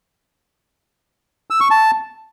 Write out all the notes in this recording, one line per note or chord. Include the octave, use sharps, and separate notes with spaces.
E6
C#6
A5